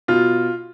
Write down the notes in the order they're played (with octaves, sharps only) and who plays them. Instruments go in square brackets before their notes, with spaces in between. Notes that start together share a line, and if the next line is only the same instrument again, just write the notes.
[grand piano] B2 F4